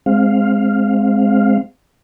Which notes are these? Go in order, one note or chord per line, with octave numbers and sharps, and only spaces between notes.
G#3 C4 F5